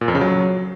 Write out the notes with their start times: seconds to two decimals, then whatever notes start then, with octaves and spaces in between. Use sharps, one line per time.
0.01 A#2
0.08 F2
0.15 C#3
0.21 F#3